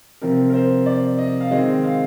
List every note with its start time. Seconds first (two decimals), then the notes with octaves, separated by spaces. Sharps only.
0.22 C3 F3 C4 A#4
0.50 A#4
0.54 C5
0.86 D5
1.19 D#5
1.41 F5
1.51 D#3 G#3 C4 D#5
1.84 F5